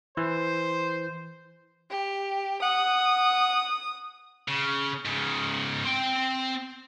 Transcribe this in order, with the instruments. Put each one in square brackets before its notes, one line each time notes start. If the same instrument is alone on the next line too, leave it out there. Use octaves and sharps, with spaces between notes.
[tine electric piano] E3 [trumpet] C5
[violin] G4
[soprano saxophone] F#5 [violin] D#6
[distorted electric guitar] C#3
G#2 C#3
C4 G5